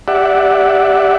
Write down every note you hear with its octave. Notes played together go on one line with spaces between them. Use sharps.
G4 D5 E5 F#5